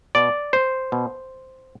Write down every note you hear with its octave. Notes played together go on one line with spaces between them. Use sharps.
B2 D5
C5
B2